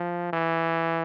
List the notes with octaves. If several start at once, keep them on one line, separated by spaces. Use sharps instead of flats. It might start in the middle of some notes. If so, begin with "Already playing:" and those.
Already playing: F3
E3